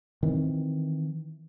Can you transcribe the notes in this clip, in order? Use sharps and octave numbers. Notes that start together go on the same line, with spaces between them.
D#3 E3 C4